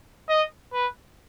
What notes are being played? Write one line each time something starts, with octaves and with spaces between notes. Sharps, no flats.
D#5
B4